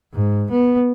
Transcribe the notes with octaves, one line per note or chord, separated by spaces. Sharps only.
G#2
B3